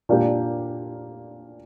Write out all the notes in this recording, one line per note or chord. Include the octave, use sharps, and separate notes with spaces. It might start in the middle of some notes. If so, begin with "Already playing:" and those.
A#2 A#3 D4 G4